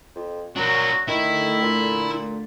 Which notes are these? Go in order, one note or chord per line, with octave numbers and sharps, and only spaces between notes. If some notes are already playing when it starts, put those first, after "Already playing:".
F2
F#3 D4 F#4 A#4
D3 D#3 A3 E4 E5
A#2